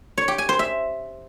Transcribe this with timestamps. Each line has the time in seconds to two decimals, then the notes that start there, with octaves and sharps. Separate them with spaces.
0.18 C#5
0.28 G4
0.38 G#5
0.49 C5
0.59 E5